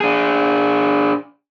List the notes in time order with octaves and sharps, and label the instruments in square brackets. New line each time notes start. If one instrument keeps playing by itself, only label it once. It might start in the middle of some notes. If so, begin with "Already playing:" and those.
[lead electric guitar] D4 G#4